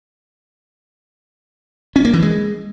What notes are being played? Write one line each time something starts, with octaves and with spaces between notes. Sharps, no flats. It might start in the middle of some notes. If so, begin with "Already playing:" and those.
C#4
A#3
E3
G#3